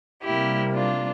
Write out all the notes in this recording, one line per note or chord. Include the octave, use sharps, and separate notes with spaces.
C3 G3 A#3 E4 G4
D4 F4